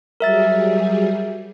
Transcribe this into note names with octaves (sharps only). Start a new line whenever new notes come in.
F#3 G3 G#4 A#4 E5 A6